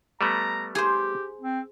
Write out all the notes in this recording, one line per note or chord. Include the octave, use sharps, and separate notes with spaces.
G3 A3 B3 A#5
G4 G#4 C5
C4